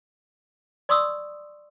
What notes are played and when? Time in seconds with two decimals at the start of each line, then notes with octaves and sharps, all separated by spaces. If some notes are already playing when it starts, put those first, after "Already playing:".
0.89 D5 C6 C#6 D#6 E6